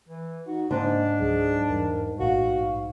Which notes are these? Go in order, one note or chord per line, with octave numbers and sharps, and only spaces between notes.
E3
D#4 F#4
G#2 C#3 A#3 D4 D#5
C#2 F#3 G#4
E2 G2 A#4
A#1 A2 F#4 F5